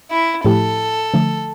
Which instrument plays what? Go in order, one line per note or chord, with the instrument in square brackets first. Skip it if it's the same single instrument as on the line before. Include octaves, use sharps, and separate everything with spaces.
[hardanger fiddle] E4
[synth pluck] A2 F3 A3 E4 G4 [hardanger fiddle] A4
[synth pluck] D3 F3 A3